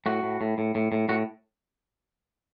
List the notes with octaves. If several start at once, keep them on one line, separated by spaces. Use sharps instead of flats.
A2 F#4
A2
A2
A2
A2
A2
A2 F#4